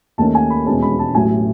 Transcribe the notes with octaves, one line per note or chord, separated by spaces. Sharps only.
D#2 D#3 A3 C#4 A5
G#5
B5
E1 E2 B2 G#3 C#4 A5
B5
A5
A1 A2 F#3 G#5